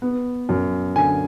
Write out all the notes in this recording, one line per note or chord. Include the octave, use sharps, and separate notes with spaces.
B3
F#2
D3 G#5